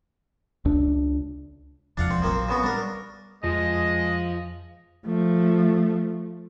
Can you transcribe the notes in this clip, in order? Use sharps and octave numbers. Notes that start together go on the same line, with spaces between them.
C#2 D4
E1 C2 F2 D4 F5 F#5
C4
A#1 F3 F#3 A#3 C4
C#3 B3 F#4
G3 D4 A#4
F2 F3 G#3 D#5
F3 A3